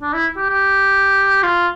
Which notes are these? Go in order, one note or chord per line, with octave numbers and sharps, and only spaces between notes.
D4
E4
G4
G4
F4